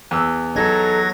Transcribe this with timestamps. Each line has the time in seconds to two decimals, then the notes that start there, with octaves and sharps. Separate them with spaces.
0.11 E2 E6
0.56 F#3 D#4 A4 G#6 A#6